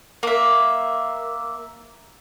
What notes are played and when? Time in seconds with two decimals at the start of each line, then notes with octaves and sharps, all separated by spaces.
0.23 A#3 E5